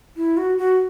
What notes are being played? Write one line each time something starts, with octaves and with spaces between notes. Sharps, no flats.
E4
F#4
F#4